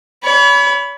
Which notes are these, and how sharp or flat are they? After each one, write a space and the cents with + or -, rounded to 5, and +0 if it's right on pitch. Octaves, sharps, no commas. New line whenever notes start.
C#5 +40 B5 +0